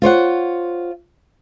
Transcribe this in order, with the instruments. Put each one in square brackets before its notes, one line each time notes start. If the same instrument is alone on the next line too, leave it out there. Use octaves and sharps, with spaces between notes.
[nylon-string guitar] F4 C5 C#5 F#5